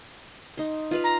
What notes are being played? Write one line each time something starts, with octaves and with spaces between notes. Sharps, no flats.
D#4 C6
F4 B4 F5
A#5